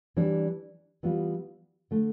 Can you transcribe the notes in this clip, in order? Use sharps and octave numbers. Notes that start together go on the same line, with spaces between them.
E3 G3 D4
E3 G3 B3 F4
D3 A3